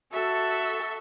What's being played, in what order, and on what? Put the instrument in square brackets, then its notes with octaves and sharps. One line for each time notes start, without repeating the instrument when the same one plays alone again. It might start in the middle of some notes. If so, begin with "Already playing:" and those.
[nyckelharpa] F#4 [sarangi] A4 [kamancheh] E5